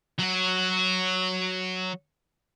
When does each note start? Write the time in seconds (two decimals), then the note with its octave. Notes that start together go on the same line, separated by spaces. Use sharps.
0.19 F#3 F#4